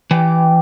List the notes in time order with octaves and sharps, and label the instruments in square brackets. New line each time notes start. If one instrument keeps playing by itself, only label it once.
[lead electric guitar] E3 [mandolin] G4 D5 G5